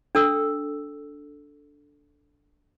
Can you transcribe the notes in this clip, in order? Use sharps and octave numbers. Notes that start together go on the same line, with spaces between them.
D4 A4 E6